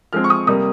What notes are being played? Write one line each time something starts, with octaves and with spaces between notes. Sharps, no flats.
F3 G#3 C4 F6
C#6
D#6
C3 G3 A#3 D#6